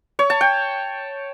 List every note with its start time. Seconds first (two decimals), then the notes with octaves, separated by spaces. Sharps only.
0.19 C#5
0.30 A5
0.41 G5